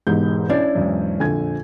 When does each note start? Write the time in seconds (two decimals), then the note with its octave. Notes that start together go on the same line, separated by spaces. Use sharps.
0.07 E1 E2 G#2 G4 G6
0.49 C#4 D4 E4 D5
0.75 B1 E2 G#2
1.20 A#1 F2 D3 G#5 G#6